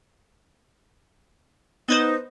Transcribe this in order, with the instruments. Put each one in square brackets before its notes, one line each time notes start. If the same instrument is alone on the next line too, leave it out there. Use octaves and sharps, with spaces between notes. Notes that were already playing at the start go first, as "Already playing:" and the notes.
[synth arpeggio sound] B3 B4 C5 [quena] D#4